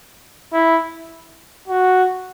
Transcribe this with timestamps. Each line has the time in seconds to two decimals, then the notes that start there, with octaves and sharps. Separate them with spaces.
0.53 E4
1.68 F#4